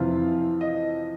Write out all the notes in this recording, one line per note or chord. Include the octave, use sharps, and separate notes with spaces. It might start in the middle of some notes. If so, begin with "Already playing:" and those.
Already playing: F2 C3 E3 F4 F5
D#5